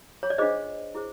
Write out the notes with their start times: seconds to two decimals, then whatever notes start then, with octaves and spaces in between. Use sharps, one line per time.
0.23 C#5
0.30 D5
0.38 D4 F4 G#4 C5 D#5
0.95 E4 G#4 C5